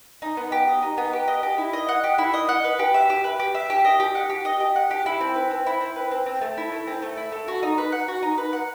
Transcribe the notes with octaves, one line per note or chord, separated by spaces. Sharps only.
D#4
B3
G4
D#5
D#4
B3
G4
D#5
G4
E4
D#5
F#5
G4
E4
D#5
F#5
B4
G4
E5
G4
B4
G4
E5
G4
D#5
G4
F#5
G4
D#5
G4
F#5
G4
E4
C4
B4
C4
E4
C4
B4
C4
C4
A3
E4
A3
C4
A3
E4
A3
F#4
D#4
B4
F#5
F#4
D#4
B4
F#5